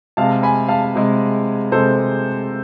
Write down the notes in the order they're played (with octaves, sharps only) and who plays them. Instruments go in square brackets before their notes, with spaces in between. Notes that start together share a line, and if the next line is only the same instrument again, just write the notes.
[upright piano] C3 G#3 F5 A5
G#5 B5
F5 A5
C3 G#3
C3 G#3 A4 C5